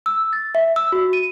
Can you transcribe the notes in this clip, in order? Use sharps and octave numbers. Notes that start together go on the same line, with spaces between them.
E6
A6
E5
E6
F#4
D#7